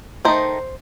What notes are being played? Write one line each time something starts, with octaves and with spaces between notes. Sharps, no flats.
D#3 A3 D#4 C5